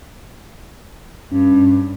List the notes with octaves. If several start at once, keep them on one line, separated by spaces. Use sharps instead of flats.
G2 C#4